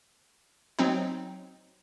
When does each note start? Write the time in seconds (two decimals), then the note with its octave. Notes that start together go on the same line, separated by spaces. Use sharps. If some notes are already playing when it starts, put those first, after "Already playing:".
0.79 F#3 C4 D#4